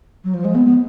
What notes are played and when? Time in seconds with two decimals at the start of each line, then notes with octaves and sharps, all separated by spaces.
0.24 F#3
0.34 F3
0.44 G#3
0.55 B3
0.66 B3